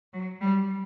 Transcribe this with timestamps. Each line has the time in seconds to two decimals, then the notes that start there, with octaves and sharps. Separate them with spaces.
0.14 F#3
0.41 G3